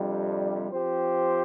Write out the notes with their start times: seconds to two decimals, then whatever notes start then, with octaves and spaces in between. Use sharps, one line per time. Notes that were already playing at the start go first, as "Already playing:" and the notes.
Already playing: F2 C3 G3 D4
0.70 F3 C4 G4 C5